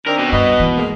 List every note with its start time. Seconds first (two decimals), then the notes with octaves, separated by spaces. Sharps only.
0.07 D#3 C4 D4 A#4
0.19 B2
0.32 G2 B4 D#5
0.60 E3
0.76 G#3 A#3